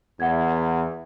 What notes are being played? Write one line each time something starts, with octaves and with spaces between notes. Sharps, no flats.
E2 E5 F#5 G#6